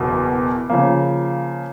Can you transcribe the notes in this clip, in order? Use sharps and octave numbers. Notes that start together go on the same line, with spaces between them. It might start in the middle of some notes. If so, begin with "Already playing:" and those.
Already playing: F#1 E2 B2
C#3 F3 A#3